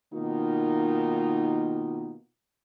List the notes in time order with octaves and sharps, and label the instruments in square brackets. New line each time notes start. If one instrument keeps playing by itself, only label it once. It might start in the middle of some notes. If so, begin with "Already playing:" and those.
[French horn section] B2 D#3 A#3 D#4 F4